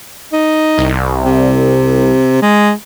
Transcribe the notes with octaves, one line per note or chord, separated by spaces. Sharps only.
D#4
C2
C3
G#3